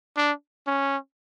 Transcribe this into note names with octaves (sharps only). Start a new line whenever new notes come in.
D4
C#4